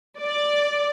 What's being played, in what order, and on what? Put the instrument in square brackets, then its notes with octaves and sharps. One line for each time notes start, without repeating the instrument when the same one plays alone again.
[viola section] D5